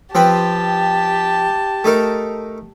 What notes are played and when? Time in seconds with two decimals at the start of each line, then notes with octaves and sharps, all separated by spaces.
0.15 F3 C4 G4 B4 A5
1.84 A3 D#4 A#4